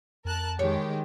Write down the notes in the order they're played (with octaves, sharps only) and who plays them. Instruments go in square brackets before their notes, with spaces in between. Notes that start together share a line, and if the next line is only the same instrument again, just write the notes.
[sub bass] F2 [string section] A#4 A5 F#6
[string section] D#3 G#3 G4 [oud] C#5